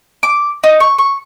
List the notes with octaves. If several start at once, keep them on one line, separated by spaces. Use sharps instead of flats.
D6
D#4
C#6
C#6